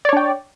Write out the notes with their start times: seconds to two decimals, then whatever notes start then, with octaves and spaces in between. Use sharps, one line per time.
0.05 D5
0.09 C#5
0.13 D4
0.17 G5